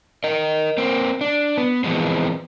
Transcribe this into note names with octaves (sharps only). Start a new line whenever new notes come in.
A#4 D#5
A#3 C4
D4
B3
E3 F3 G#3 B3 C4